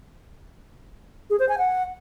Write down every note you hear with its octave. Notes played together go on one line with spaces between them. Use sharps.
G#4
C5
G#5
F#5